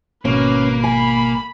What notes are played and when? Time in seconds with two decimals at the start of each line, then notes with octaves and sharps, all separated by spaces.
0.25 G#1 B2 A#3 C#4 B4
0.84 G#5 B5